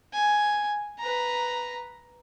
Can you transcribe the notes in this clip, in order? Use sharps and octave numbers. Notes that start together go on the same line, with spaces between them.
G#5
B4 A#5